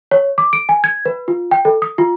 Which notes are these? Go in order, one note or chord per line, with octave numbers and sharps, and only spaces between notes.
C#5
D6
D7
G#5
G#6
B4
F4
G5
A4
D#6
F4